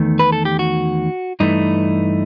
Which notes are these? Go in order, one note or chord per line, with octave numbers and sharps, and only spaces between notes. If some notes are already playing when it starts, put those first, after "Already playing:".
Already playing: E2 D#3 A3
B4
A4
G4
F#4
G2 E3 A3 D#4